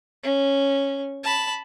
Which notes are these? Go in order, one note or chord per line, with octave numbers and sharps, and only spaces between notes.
C#4
A5 B5